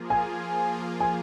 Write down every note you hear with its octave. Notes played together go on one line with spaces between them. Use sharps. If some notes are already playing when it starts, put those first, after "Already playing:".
Already playing: F3 A#3 F4 G#4
G#5
G#5